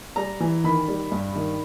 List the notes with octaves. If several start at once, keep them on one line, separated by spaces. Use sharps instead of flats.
G3 A#5
E3
D#3 B5
G3
G2
D#3